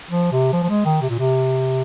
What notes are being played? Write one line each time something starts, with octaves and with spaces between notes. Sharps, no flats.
F3
C3
F3
F3
G#3
D#3
C3
A#2
C3